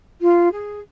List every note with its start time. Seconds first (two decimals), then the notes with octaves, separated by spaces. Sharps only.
0.21 F4
0.52 G#4